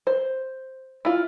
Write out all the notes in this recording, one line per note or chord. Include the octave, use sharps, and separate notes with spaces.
C5
E4 F4